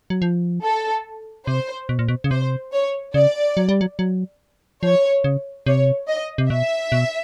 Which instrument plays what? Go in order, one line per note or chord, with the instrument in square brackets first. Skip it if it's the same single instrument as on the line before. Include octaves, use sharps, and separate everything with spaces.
[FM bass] F#3
F3
[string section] A4
[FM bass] C3 [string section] C5
[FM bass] B2
A#2
B2
C#3
[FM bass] C3 [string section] C5
[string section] C#5
[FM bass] C#3 [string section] D5
[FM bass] F#3
G3
F#3
F#3
[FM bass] F3 [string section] C#5
[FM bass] C#3
[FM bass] C3 [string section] C#5
[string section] D#5
[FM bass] C3
[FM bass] B2 [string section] E5
[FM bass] B2